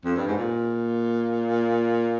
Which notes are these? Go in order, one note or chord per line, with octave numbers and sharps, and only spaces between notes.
F2
G2
G#2
A#2